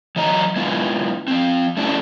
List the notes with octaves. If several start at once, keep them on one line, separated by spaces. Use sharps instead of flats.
E3 F#3 D#5 A#5
G#3 B3 E4 F4
F3 C4
A3 C#4 D4 E4 F#4